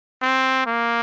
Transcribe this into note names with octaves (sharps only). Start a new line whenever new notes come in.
C4
A#3